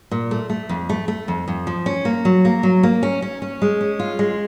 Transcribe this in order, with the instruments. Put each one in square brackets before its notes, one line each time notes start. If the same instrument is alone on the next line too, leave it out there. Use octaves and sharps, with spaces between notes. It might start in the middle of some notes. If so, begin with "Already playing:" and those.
[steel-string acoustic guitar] A#2
A3
A3
F2
A3
A3
F2
F2
F3
C#4
A#3
F#3
A#3
F#3
A#3
C#4
C#4
C#4
G#3
C#4
F4
G#3